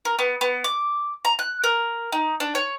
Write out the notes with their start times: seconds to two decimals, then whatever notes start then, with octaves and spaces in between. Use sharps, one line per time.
0.05 A#4
0.19 B3
0.41 B3
0.64 D6
1.25 A#5
1.39 F#6
1.64 A#4
2.12 D#4
2.40 D4
2.55 C#5